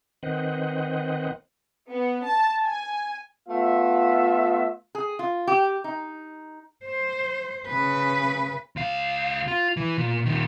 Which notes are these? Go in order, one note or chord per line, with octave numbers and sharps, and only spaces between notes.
D#3 C4 B4 C5 D#5 F#5
B3
A5
G#5
A3 B3 F4 E5
G#4
F4
G4
D#4
C5
C#3 B4
C#2 F5
F4
E3
A#2
A#2 D#3